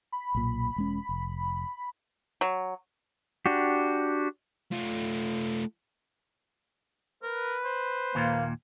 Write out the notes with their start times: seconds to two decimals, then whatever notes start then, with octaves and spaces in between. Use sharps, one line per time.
0.12 B5
0.35 B1 A#2
0.76 E1 G#3 C#4
1.09 F1
2.41 F#3
3.46 D4 F#4 G4
4.72 A3 F4
7.23 A#4 B4
7.65 C5
8.15 D#2 A#2 A#3